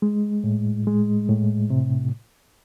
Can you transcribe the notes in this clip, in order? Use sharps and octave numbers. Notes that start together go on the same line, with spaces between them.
G#3
A2
G#3
A2
C3